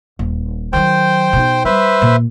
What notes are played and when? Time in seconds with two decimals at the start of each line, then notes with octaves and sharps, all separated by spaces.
0.19 D#1
0.73 D#3 F#3 C5 G5
1.33 B2 D#4
1.65 G3 B4 C5 E5
2.02 A#2